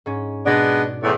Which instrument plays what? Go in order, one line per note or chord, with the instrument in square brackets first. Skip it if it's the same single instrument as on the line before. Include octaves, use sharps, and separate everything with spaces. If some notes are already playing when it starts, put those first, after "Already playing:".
[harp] G#2 C#4
[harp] B2 D5 [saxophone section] G#3 B3 D4
[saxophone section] E2 A2